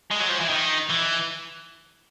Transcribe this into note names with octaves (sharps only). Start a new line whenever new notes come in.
G#3
F#3
F3
E3
D#3
E3